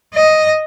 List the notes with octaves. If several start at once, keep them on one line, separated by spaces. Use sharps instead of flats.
D#5